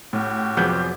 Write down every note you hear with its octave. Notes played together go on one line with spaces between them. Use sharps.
A2 C#4 F#4 G4
F1 F2 F3 F#3 B3 G#4 D6 G6